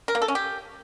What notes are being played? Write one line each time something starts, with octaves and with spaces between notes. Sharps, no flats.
A#4
A#3
A4
C#4
G4